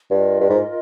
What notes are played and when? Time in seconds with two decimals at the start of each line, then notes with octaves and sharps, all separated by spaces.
0.10 G2 F4 A#4 D#5
0.41 G2
0.49 G#2